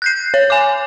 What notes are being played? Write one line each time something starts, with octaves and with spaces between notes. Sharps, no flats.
F#6 G6 C7
C#5
G#5 D6